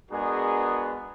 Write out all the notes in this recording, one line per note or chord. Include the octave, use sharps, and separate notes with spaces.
G#3 B3 D4 F#4 G#4 A#4